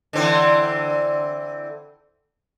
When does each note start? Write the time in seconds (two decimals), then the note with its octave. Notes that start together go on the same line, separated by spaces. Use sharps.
0.13 D3 E3 C4